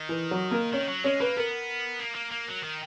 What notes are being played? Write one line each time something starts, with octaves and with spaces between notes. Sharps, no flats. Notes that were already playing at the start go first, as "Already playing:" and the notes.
Already playing: D#3
E3
F#3
A#3
D#3 C#4
F#3
G#3 C#4
A#3 B4
B3 A#4
A#3
A#3
A#3
F#3
D#3